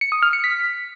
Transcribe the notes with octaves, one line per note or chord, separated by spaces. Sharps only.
C#7
D#6
F6
C#7
B6